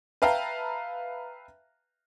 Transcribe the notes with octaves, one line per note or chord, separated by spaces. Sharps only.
B4 E5 F5 G5 A5 A#5